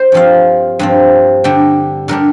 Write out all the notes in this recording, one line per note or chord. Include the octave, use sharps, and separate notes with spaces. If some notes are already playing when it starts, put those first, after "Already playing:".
Already playing: C5 G5
G2 F3 C4 F5
G2 F3 C4
D3 G3 D4 G5
D3 G3 D4 A#4